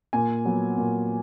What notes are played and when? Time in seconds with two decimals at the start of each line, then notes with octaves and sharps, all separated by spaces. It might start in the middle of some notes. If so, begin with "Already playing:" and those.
0.13 A#2 G#5
0.45 F#3 B3
0.77 A#2